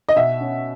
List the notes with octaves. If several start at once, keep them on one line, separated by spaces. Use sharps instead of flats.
D#5
B2 E5
C#4